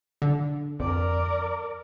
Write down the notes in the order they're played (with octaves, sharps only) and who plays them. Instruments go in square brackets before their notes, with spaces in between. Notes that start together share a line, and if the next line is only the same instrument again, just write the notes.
[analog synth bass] D3
[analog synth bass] F2 [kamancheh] A#4 D5